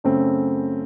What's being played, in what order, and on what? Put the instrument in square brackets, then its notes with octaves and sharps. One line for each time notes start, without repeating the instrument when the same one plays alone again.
[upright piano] F#2 C#3 A3 C4